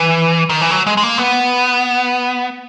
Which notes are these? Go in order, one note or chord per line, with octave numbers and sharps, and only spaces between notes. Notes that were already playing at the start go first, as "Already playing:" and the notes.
Already playing: E3
D#3
E3
F#3
G#3
G#3
A#3
B3